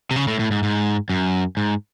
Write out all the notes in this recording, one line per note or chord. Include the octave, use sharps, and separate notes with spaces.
C3
C#3
A2
A2
G#2
G#2
F#2
G#2